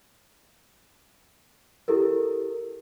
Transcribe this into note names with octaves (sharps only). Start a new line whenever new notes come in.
E4 G4 A4 A#4